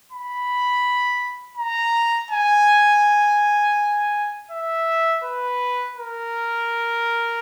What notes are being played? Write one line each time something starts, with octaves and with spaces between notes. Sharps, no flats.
B5
A#5
G#5
E5
B4
A#4